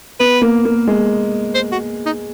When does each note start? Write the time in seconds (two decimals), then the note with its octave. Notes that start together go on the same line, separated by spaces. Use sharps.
0.20 B3 B4
0.42 A#3
0.65 A#3
0.88 G#3
1.55 C5
1.72 F#4
2.06 D#4